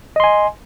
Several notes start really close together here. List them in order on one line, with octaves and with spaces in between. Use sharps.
D#5 C6 G#5